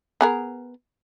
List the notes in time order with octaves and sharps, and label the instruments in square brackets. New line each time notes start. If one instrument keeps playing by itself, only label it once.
[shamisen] B3 G#4 A#4